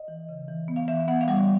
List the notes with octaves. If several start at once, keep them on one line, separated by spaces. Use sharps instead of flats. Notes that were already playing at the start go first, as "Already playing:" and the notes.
Already playing: D#5
E3
C#3
E3
B3
F5
E3 E5
B3 F#5
F5
G3 F#5